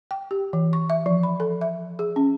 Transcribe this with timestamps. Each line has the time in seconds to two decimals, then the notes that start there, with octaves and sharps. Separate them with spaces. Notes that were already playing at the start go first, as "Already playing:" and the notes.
0.11 G5
0.31 G4
0.53 E3
0.73 C#6
0.90 E5
1.06 F3
1.23 B5
1.40 A4
1.61 E5
1.99 G#4
2.16 C#4